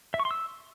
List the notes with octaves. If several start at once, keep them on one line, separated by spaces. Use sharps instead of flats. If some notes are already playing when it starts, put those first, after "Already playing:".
E5
C#6
C6
E6